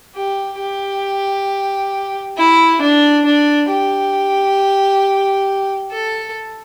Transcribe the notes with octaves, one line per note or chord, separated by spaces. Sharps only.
G4
G4
E4
D4
D4
G4
A4